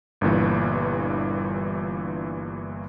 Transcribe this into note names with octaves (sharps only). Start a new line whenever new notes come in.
G1 G2 A#2 E3